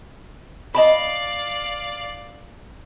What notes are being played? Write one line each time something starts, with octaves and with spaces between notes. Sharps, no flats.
D5 D#5 F5 A5 B5